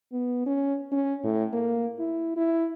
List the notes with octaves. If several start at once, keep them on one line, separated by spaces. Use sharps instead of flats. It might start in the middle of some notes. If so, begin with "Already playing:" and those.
B3
C#4
C#4
A2
A#3
E4
E4